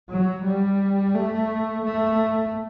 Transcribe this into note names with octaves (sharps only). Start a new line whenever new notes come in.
F#3
G3
A3
A3